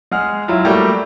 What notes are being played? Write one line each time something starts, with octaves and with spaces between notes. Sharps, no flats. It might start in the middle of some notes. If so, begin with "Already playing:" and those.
G#3 G#4 F#5 F6
F#3 E4 F4
G3 A3 A#3 F#4 G5